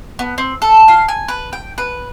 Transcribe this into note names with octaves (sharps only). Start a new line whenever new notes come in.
B3
C4
A4
F5
G#5
B4
G5
B4